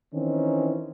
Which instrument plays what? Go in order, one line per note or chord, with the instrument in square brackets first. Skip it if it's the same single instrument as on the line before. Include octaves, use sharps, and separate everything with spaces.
[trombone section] D#3 E3 C4 C#4